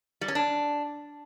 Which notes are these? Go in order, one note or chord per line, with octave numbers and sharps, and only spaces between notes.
G3
C#4
D4